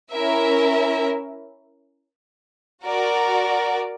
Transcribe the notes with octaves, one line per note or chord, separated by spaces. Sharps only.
C#4 E4 A#4 E5
F#4 A#4 D5